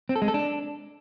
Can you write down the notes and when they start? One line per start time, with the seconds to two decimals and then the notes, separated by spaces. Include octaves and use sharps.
0.09 C4
0.16 A4
0.22 G#3
0.28 A4
0.34 D4